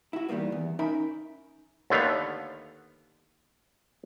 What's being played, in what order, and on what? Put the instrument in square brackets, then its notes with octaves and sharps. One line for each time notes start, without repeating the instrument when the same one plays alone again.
[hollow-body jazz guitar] E4 F#4
E2 D#3 G3 A#3 B3
E2
C#4 D#4 A#4 E5 G5 B5
[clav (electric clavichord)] D#2 D3 A3 B3 F5